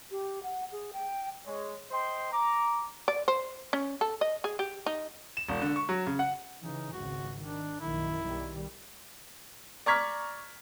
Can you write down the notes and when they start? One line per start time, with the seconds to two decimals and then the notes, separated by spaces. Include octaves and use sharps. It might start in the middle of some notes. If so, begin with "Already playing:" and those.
0.11 G4
0.43 F#5
0.72 G#4
0.93 G5
1.46 G#3 C#5
1.91 C5 D#5 G5 C6
2.32 A#5 D6
3.08 D5
3.28 C5
3.73 C#4
4.01 A4
4.21 D#5
4.44 G#4
4.59 G4
4.86 D#4
5.37 E7
5.49 E1
5.62 D3
5.76 C#6
5.89 F#3
6.07 C#3
6.19 F#5
6.62 C#3 E3 D#4
6.93 G#1 C#2 F#4
7.39 D#3 D4
7.81 A#1 F#2 D#3 E4
8.22 B1 D#3 G3
9.86 D5 A#5 C#6 F6 G#6 B6